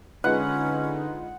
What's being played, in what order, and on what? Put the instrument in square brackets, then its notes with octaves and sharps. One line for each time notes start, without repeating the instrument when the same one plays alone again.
[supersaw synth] D3 D#4 [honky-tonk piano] G#3 F4 B4 [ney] C#4 [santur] F#5